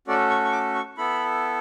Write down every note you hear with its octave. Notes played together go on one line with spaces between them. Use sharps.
A3 C#4 F#4 A4 D5
C#6
C#6
D6
C#6
B3 E4 A4 B5